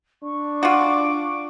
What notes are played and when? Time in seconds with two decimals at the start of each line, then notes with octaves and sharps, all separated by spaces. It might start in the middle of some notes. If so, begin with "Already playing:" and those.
0.23 D4 C#6
0.63 F4 F#4 D6